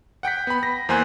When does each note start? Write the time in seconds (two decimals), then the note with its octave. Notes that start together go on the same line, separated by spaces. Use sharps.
0.23 F#5 G5 G6 B6
0.47 B3 B5
0.63 A#6
0.89 E2 A#3 C5 G#5 C6 F#6